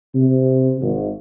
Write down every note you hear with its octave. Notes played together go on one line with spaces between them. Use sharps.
C3
G#1